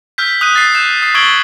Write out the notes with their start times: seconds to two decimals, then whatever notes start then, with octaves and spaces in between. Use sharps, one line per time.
0.18 E6 F6 G6 B6
0.41 D#6 F#6 D#7
0.56 A6 C7
0.74 F#6 G6 E7
1.02 D#6 C7
1.15 C#6 E6 G#6 D7 F#7 G7